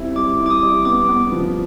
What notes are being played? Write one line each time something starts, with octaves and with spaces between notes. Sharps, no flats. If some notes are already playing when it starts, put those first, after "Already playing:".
Already playing: G3 C4 E4
G3 D6
E4
D6
D#6
G3
B3 D6
B3
F3